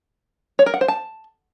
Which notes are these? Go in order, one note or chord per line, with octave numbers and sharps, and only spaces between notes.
C#5
A#4
F#5
C5
A5